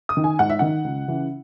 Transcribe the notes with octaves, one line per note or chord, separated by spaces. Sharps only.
D#6
D#3
G#5
G#2 F#5
E5
D#3 F#5
C#2
C#3 E3